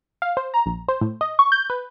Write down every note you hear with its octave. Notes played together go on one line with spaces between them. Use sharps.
F5
C5
A#5
A#1
C5
A2
D#5
C#6
G6
B4